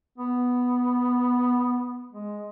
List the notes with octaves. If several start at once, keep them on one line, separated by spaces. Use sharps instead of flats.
B3
G#3